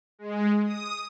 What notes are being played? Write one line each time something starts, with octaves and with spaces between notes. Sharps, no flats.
G#3
D#6